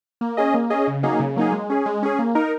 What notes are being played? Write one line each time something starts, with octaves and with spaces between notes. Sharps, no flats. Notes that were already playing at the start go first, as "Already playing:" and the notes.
A#3
C#4 G#4 D#5
A#3
C#4 G#4 D#5
C#3
F#3 A#3 D#4 G#4
C#3
F#3 A#3 D#4 G#4
G#3
C#4 G#4
G#3
C#4 G#4
A#3
D#4 A#4